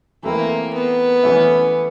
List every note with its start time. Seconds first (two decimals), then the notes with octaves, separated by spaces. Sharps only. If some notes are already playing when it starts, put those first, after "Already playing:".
0.23 E3 A3 A#3 C4 E4
0.74 B3
1.23 E3 A3 C#4 E4